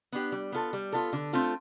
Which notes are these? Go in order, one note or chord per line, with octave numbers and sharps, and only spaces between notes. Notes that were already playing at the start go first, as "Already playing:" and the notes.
B3 D4 G4
G3
B3 F4 A4
G3
B3 F4 A4
D3
A3 C4 F4 A4